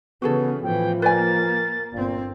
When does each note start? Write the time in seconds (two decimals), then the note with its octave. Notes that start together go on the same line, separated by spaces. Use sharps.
0.22 C#3 E3 B3 F#4 G#4 A4
0.63 A2 E3 F3 G5
1.02 A#3 B4 D5 G#5 A6
1.93 G1 A#2 C4